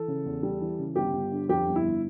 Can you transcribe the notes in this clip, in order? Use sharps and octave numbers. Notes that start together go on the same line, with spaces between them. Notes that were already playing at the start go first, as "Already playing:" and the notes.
Already playing: E3 A4
C#3
E2
G3
E3
C#3
G1 G4
G1
D3
F2 G4
G1
E4
G1